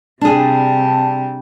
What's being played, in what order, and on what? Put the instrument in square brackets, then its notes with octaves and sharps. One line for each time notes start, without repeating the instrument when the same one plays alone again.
[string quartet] C3 G3 [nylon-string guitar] D4 G#4 [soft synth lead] A5